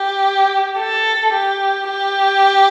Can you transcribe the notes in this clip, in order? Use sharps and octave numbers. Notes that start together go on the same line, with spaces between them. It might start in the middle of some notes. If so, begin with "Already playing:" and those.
Already playing: G4
A4
G4
G4